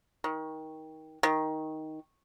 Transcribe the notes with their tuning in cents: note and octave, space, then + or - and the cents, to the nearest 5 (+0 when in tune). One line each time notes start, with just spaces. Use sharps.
D#3 +20
D#3 +10